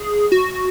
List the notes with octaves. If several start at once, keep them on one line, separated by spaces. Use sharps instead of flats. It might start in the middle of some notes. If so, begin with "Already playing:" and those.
Already playing: G#4
F#4